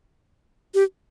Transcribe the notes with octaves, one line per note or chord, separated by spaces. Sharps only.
G4